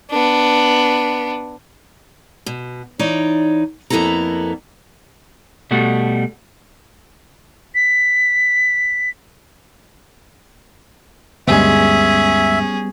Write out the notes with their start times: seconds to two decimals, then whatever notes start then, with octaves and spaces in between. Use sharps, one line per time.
0.11 B3 D4
2.46 B2
2.99 E3 D#4 C#5 D5
3.90 F2 A#3 B3 E4 A4 A#5
5.71 B2 G3 A3 F#4
7.75 B6
11.48 D2 G2 G3 G#3 B3 C#4 G#4 E5